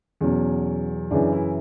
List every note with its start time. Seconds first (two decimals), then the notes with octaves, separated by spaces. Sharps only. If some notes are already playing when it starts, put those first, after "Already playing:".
0.21 E2 B2 F#3 C#4
1.11 F#2 C#3 E3 D4
1.33 E4